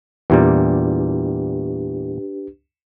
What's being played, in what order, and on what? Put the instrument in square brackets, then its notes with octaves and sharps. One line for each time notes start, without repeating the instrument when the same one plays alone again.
[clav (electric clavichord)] E2 A#2 G3 [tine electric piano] D4 G4 B4